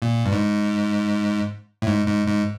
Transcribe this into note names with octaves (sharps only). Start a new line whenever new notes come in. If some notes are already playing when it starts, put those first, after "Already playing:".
A#2
G2
G#2
A2
G#2
G#2
G#2